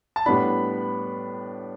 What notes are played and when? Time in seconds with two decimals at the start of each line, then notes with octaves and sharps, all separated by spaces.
0.16 A5
0.26 A2 G3 B3 D4 B5